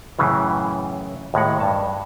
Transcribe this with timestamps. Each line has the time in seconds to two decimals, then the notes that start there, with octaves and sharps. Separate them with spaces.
0.19 F#2 A2 C#3 E3
1.34 D#2 A2 G#3 F#5
1.60 G2 A5